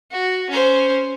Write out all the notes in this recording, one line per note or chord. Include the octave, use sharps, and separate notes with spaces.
F#4
C#4 C5